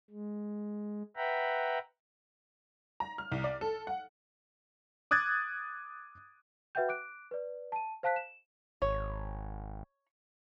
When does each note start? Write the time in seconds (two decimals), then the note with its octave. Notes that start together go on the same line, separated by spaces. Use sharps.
0.10 G#3
1.16 B4 E5 F#5 G5 A#5 B5
3.00 A#5
3.18 F6
3.32 C2
3.44 D5
3.61 A4
3.87 F#5
5.11 D6 D#6 F#6 G#6 A6
6.75 F#4 B4 E5 F#5 G5 G6
6.89 D6 F#6 D7
7.31 B4 D5
7.72 A5 D#7
8.03 C5 F5 A5 F#6 B6
8.16 E7
8.82 G#1 C#5